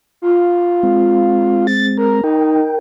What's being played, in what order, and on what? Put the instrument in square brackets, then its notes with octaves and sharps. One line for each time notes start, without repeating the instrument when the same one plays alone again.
[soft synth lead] F4
[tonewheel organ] G#3 C4
[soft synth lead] A6
A#4
[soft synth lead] D#4 [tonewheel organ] A#4 G5